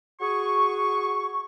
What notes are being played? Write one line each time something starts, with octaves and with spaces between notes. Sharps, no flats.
F#4 G#4 C#6